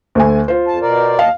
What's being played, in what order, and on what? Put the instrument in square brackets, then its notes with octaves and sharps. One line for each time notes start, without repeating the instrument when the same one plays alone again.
[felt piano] D2 A3 G#5
F4 C5
[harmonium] F2 A5
B2 A#4 D5
[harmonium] D#2 D#5 A5 [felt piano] F5